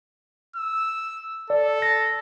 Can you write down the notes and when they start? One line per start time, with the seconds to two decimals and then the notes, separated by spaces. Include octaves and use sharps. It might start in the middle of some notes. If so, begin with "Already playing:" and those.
0.56 E6
1.50 A4 D5
1.82 A#6